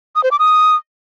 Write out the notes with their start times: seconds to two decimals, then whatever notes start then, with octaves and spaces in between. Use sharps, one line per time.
0.16 D#6
0.24 C5
0.31 D6
0.39 D#6